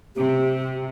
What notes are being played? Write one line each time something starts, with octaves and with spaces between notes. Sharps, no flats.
C3 G4